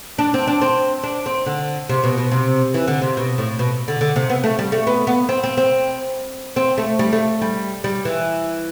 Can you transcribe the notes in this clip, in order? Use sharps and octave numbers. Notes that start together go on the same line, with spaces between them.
D4
C4
D4
C4
D4
C4
D3
C3
B2
B2
C3
E3
D3
C3
B2
A2
B2
D3
D3
C3
B3
A3
G3
A3
B3
B3
C4
C4
C4
C4
A3
G3
A3
G3
G3
E3